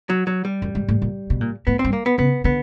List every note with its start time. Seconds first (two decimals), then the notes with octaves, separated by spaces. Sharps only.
0.09 F#3
0.27 F#3
0.45 G3
0.62 F#2
0.75 G#2
0.88 A2
1.02 A#2
1.30 B2
1.41 A#2
1.67 A2 B3
1.79 C4
1.85 G2
1.93 A#3
2.06 B3
2.18 C#3 B3
2.44 D3 B3